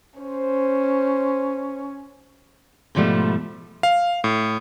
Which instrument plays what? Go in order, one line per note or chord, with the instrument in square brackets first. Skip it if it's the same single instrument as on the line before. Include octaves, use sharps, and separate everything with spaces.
[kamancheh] C#4 [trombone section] C5
[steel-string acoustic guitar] G#2 B2 F3 G3 A3
[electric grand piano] F5
A2